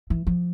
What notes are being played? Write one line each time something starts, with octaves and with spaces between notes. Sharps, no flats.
E3
F3